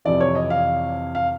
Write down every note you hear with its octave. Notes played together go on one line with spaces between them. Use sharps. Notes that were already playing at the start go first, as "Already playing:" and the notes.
F2 C3 E3 D5
C#5
D#5
F5
F5